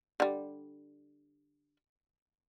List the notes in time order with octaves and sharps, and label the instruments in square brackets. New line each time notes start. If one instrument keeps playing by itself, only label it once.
[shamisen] D3 G3